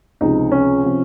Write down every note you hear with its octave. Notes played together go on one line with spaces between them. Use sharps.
C#2 C3 F3 D#4
C#4
C3 F3